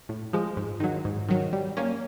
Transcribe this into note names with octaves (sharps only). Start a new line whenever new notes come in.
A2
F3 G#3
G#2
D#3 F#3
G#2
D#3 F#3
G3
A#3 C#4